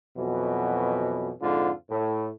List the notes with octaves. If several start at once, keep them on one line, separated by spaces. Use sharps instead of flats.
F2 B2 E3 F#3
F2 G#2 D3 F4
A2